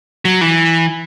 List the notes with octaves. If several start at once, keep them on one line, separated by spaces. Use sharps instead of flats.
F#3
E3